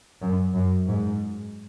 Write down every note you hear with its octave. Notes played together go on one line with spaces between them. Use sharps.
F#2
F#2
G#2